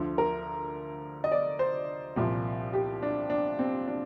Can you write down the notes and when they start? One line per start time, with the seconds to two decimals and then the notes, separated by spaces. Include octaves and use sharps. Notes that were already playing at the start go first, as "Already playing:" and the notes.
Already playing: D2 D3 F3
0.18 A#4
1.24 D#5
1.32 D5
1.59 C5
2.16 C2 A#2 F3
2.73 G4
3.02 D4
3.30 D4
3.59 C4
3.88 D4